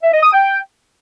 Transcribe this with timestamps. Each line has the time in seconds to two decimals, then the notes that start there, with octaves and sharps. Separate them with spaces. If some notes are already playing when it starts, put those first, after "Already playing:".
0.03 E5
0.13 D#5
0.23 D#6
0.33 G5